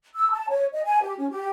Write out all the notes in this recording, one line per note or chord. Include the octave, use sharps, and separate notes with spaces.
E6
A5
C#5
D#5
G#5
G4
C#4
G4